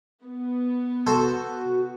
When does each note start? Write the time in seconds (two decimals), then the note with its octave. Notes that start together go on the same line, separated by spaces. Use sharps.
0.24 B3
1.07 F#4 A4 C5